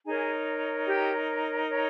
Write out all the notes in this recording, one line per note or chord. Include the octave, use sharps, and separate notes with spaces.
D#4 G#4 A#4 C#5 G#5
G4 G5
C#5